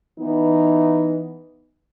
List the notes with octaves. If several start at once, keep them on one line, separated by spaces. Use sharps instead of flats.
E3 B3 D#4